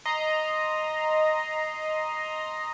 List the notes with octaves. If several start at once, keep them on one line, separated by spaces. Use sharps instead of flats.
D#5 A#5 C6